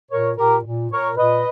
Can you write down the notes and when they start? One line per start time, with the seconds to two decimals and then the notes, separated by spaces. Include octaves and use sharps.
0.11 A#2 A#4 C#5
0.37 A#2 G4 A#4
0.64 A#2
0.90 A#2 A#4 C#5
1.17 A#2 B4 D#5